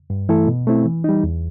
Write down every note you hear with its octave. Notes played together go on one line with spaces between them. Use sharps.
G2
E3 A3 E4 A4
B2
A3 C4 E4
E3
G3 D#4
E2